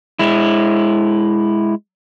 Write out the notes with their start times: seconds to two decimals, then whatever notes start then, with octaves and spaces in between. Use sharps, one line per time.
0.19 G#3 E4